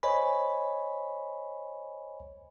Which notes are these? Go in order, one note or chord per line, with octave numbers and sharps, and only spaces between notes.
C5 C#5 D#5 G#5 B5